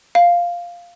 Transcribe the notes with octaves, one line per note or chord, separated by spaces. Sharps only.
F5